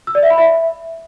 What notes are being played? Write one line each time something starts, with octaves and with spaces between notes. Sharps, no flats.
E6
D5
E5
B5
E5